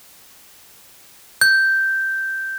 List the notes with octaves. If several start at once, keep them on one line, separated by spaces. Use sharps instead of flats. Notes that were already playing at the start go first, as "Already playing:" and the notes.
G6